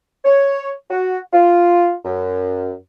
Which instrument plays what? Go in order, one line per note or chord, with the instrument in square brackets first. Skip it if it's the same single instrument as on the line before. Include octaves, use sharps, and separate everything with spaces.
[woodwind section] C#5
F#4
F4
F#2